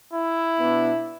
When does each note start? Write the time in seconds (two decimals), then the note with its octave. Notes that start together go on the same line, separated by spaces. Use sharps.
0.12 E4
0.59 B2 B3 D4